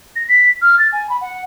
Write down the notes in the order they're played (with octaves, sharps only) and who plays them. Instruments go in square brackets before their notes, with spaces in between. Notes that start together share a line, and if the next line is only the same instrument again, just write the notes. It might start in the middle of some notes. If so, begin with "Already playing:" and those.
[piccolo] A#6
B6
F6
A6
G#5
B5
F#5